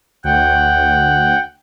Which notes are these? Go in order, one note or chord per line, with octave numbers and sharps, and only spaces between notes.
D2 F#5 G5